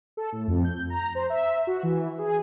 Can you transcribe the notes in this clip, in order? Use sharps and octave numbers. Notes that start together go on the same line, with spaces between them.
A4
A2
F2
G6
A#5
C5
E5
F#4
E3
G#4